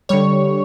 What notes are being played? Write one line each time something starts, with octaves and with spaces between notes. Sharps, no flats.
D3 G3 C#5